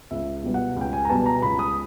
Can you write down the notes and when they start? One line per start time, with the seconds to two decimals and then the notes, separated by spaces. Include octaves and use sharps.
0.11 C#2 E5
0.43 B2 G3 B3
0.54 F#5
0.76 C#2
0.81 G5
0.93 G#5
1.05 A#5
1.09 B2 G3 B3 A5
1.26 A#5
1.42 C#2 B5
1.59 D#6